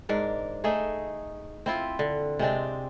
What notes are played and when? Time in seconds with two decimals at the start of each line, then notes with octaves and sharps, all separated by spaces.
0.09 G#2 D4 A#4
0.64 A3 D#4 G#4 E5
1.66 C4 E4 F4
1.99 D3
2.39 C3 G#3 C4 D4